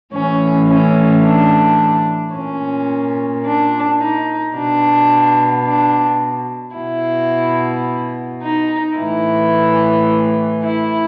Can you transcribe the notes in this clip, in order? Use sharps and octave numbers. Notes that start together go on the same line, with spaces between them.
A2 E3 C#4
C#4
D4
A#2 C#4
D4
D#4
B2 D4
D4
B2 E4
D#4
A2 E3 E4
E4